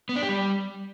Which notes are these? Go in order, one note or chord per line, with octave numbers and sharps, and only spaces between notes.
B3
D4
G4
G3